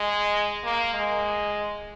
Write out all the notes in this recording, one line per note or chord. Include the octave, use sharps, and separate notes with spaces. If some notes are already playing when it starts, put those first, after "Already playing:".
Already playing: G#3
A#3
G#3